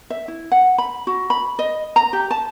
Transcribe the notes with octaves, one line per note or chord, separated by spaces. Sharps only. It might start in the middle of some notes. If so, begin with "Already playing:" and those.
E5
E4
F#5
B5
F#4
B5
D#5
A#5
G4
A5